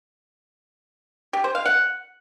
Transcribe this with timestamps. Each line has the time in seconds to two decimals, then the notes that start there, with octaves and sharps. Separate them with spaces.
1.33 G4
1.44 C5
1.55 F5
1.66 F#5